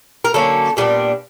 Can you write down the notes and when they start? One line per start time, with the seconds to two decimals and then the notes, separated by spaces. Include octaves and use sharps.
0.25 A#4
0.34 D3 F#3 A#3 C#4 A4
0.77 A#2 G3 B3 D4 G#4